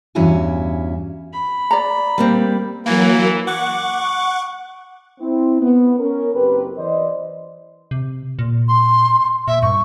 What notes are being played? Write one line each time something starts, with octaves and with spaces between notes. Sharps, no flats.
E2 G2 C#4 E4 F#4 G#5
B5
D5 A#5
G3 A#3 C4
E3 F#3 A#3 E4
F#5 C#6 D6
C4 E4
B3
C#4 A#4
F#1 C4 G4 B4
E3 C5 D5 D#5
C3
A#2
C6
A#2 E5
G2 C#6